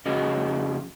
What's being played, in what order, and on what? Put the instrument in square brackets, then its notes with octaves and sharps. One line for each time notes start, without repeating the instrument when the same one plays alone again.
[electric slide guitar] F2 C#3 C#4 F#4 G#4 D#5